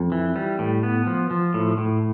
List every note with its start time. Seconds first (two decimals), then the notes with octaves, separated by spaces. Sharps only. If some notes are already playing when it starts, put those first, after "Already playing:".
Already playing: F2
0.12 E3
0.36 G3
0.59 A2
0.83 B3
1.07 F3
1.31 F3
1.54 A2
1.78 A2